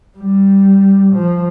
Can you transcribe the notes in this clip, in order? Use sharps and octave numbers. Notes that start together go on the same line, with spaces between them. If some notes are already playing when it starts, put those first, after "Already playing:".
G3
F3